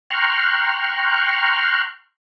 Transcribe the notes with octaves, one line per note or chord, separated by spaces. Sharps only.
G5 A#5 C6 C#6 F6 F#6